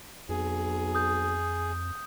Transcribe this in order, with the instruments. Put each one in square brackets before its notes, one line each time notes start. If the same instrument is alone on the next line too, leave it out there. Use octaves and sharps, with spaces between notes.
[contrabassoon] B1 [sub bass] F2 [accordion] G#4
[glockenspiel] D#6 G6